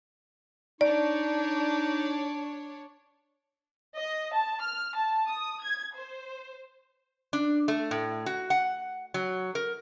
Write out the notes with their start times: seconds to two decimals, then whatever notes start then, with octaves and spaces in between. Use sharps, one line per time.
0.81 D4 D#4 C#5 D5
3.97 D#5
4.32 A5
4.62 F6
4.95 A5
5.28 D#6
5.64 G#6
5.96 C5
7.33 D4
7.68 A3
7.91 A2
8.26 F#4
8.50 F#5
9.14 F#3
9.55 A#4